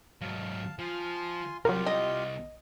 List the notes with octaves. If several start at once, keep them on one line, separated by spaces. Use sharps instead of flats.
G#2 F#3 F5 A5
F3 F4 G#5 C6
C2 F#3 F4 G4 A#4 F5
D#5